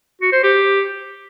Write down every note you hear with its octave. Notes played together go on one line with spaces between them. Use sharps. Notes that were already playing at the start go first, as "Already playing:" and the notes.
F#4
C5
G4